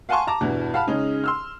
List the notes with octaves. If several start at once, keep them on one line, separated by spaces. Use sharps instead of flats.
F5 F#5 G#5 A5 C6 C#6
A5 A#5 D6
E2 G2 B2 E3
F5 F#5 A5 B5 F6
C#3 G#3 C#4 D#4 G#4
C6 E6 F6